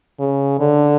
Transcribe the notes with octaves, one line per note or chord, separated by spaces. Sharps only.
C#3
D3